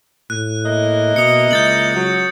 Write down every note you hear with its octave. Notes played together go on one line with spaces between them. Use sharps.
A2 F#6
A#3 E4 D#5
B2 D#6 C#7
C#2 G6 A6 F#7
F#3